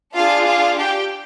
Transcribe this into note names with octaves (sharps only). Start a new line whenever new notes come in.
D4 F4 G#4 F5
F4 F5
G4 G5